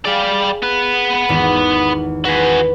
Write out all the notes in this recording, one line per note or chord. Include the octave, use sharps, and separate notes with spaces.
G3 G#4 D5 F5 G#5
B3 B4
G#1 E2 D#3
F#4 G#4 B4 B6